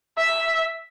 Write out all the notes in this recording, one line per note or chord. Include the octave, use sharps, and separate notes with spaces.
E5